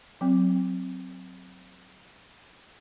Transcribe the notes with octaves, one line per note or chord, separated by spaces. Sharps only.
F#3 C4